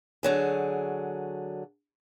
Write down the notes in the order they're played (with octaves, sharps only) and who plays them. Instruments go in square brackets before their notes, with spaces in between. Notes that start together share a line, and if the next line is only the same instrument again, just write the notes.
[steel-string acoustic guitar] D3 F#3 G#4